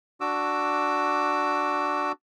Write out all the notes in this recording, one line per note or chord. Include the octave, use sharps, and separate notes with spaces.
D4 F#4 D6 E6